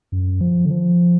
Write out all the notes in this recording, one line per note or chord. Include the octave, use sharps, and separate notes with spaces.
F#2
F3
D3
F3